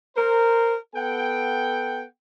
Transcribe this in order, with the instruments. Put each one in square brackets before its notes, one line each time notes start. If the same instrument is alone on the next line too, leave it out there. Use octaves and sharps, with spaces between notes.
[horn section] A#4 C5
B3 A4 F#5 G5